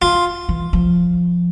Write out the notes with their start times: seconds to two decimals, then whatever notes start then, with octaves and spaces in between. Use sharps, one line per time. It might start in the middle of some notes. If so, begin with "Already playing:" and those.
0.02 D#3 F4
0.49 E3
0.73 F3